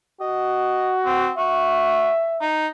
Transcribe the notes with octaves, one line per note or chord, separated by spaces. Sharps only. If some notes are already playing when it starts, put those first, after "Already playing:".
F#4 D#5
C4
F#4 E5
D#4